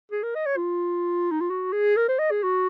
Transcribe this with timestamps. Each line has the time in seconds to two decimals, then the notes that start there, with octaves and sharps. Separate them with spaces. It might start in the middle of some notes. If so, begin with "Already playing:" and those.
0.12 G#4
0.23 A#4
0.35 D#5
0.46 C#5
0.57 F4
1.31 D#4
1.41 F4
1.50 F#4
1.73 G#4
1.97 A#4
2.08 C5
2.19 D#5
2.31 G#4
2.43 F#4